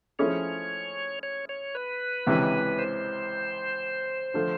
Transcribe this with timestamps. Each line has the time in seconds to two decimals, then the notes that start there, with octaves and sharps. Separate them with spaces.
0.19 F3 A3 C#4 E4 G#4 C#5
1.23 C#5
1.49 C#5
1.75 B4
2.27 C#2 C3 E3
2.79 C5
4.34 D3 F3 A3